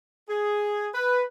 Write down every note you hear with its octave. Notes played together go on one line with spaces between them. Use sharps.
G#4
B4